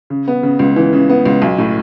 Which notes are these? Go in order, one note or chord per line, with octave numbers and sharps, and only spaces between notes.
C#3
B3
C#3
C#2
E3
C#3
B3
C#2
B1
A2